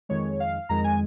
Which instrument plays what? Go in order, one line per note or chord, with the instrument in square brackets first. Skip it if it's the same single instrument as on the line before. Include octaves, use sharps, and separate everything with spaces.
[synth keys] F2 D#3 G#3 C#5
F5
F2 D#3 G#3 A#5
G#5